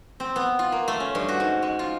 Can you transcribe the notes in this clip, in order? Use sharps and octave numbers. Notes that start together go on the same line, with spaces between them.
C4
B3
F4
A#3
A3
C#4
G2
F#4
G#2
G#3
F4